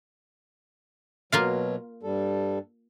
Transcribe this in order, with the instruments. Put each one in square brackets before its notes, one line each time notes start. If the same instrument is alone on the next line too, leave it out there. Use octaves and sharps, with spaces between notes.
[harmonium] B2 F#3 [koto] A#3 F4 F5
[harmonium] G2 G3 A4